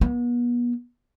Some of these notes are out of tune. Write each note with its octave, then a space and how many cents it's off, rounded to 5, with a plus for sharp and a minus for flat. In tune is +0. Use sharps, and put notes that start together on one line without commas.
B3 -35